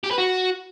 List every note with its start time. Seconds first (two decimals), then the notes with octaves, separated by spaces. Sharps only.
0.04 G4
0.11 B4
0.18 F#4